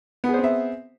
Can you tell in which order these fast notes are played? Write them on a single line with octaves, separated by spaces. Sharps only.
B3 G#4 C5 C4 E5